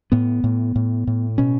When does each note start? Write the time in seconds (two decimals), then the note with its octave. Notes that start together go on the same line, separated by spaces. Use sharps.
0.12 A2 B3
0.44 A2
0.75 A2
1.07 A2
1.38 B2 C#4